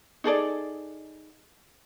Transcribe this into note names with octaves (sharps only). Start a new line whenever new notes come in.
D#4 G#4 A4 D5